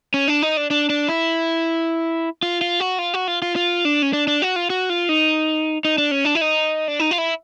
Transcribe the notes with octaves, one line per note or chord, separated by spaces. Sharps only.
C#4
D4
D#4
D4
D4
D4
E4
F4
F4
F#4
F4
F#4
F4
F4
F4
D4
C#4
D4
D4
F#4
F4
F#4
F4
D#4
D#4
D4
C#4
D4
E4
D#4
D4
D#4
F4
E4